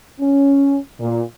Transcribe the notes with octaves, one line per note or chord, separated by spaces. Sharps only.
C#4
A#2